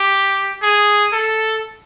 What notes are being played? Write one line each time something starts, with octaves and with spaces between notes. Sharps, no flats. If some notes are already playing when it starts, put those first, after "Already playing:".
Already playing: G4
G#4
A4